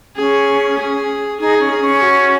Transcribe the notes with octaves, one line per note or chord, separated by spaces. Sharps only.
C#4 G#4
G#4
D#4 G#4
C#4
G#4
C#4
F#4